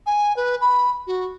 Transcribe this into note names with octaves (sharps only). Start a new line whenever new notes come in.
G#5
B4
B5
F#4